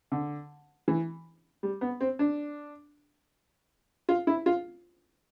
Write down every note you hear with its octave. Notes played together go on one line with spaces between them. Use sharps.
D3
E3
G3
B3
C4
D4
F4
E4
F4